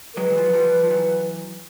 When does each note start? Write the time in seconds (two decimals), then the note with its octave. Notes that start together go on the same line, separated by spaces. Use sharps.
0.14 A#4
0.17 F#3 G#3 B4
0.30 E3
0.38 F3
0.46 F#3
0.53 F3 G3
0.84 F3
0.90 E3 F#3